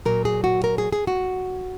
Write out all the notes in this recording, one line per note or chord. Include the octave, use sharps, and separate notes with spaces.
A#2 F#3 A#4
G#4
F#4
A#4
G#4
G#4
F#4